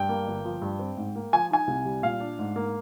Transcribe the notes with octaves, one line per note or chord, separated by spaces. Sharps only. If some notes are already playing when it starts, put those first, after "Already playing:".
Already playing: G2 G5
A#3
G1
F3
G2
C4
G#2
A#3
F3 G#5
D#4 G#5
C2
G3
A#2 F5
D4
G#2
A#3